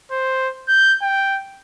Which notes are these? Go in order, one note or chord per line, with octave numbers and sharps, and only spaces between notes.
C5
G6
G5